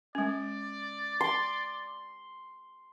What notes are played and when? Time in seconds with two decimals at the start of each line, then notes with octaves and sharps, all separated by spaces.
0.15 G#3 C#4 D5
1.21 C6